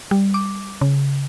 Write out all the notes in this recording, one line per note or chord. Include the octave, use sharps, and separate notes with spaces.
G3
D6
C#3